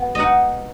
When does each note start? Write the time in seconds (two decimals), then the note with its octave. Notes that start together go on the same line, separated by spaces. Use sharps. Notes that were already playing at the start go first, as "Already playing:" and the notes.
Already playing: B2 B3
0.15 D#4 D#5 F#5